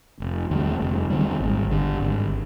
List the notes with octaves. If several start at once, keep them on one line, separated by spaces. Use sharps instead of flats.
F1
D#2 D3 G3
F1
D#2 D3 G3
G#1
G2 D3
G#1